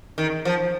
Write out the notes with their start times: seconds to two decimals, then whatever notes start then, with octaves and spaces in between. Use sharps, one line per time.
0.18 D#3
0.45 F3